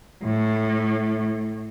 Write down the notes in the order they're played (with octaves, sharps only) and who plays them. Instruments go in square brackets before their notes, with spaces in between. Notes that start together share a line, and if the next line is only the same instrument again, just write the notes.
[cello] A2